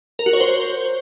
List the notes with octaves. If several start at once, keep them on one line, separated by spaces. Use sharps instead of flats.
A#4
F#4
C#5
C5